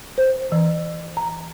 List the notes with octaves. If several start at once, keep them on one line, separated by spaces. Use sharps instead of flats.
C5
E3
A#5